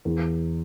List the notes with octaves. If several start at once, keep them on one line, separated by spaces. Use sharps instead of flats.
E2